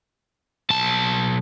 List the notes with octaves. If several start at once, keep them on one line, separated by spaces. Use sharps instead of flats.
B1 A5